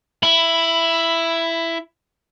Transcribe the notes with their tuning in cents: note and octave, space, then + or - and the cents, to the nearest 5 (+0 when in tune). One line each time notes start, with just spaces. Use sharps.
E4 +10 B5 +0